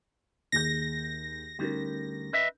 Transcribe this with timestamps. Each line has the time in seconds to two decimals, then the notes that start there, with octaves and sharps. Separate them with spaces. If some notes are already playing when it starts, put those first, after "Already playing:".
0.52 D#2 G#4 G6 A#6
1.59 D2 G3 C#4 D#4 A#4
2.33 B4 D#5 E5